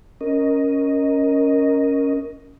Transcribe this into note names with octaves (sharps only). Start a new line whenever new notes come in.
C#4 A#4 D#5